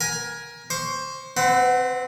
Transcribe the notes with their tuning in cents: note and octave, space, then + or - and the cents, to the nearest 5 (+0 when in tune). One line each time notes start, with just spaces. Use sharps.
A#4 +25 G#5 +0
C5 +10 C#6 +30
C4 +0 B4 +40 F#5 +0